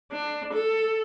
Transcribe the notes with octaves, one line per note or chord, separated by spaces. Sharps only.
D4
A4